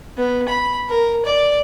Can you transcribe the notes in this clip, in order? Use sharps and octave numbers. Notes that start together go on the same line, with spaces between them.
B3
B5
A#4
D5